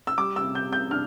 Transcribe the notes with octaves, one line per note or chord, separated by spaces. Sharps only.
E6
G3 D6
E6
C3
G6
C3
G6
D4 F6